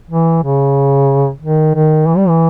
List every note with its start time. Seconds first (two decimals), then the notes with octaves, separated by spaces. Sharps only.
0.10 E3
0.43 C#3
1.41 D#3
1.74 D#3
2.07 E3
2.17 G3
2.28 E3